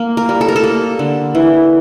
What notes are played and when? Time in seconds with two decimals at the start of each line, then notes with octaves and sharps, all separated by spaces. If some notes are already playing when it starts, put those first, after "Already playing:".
Already playing: A#3
0.17 A#4
0.29 G3
0.41 A4
0.48 A#4
0.56 A4
0.64 A#3
0.99 D3
1.35 E3